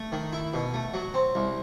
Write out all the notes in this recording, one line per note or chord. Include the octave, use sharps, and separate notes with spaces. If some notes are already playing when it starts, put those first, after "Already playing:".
Already playing: A3
D#3
E4
B2
A3
F#3
C4
C2